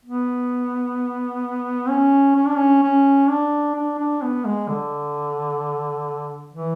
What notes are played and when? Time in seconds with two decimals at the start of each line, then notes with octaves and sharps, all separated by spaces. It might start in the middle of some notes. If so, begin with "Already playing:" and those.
0.05 B3
1.89 C#4
2.36 C#4
2.46 D4
2.55 C#4
2.83 C#4
3.28 D4
3.75 D4
3.99 D4
4.22 B3
4.45 G#3
4.69 D3
6.54 E3